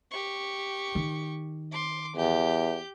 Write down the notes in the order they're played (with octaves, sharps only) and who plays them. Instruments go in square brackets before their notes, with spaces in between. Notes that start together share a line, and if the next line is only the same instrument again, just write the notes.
[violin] G4 C#6
[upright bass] D#3
[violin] C6 D6
[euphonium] E2 [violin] G4 G6